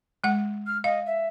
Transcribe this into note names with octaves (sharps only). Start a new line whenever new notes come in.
G#3 F#5
F6
D#5 F5
E5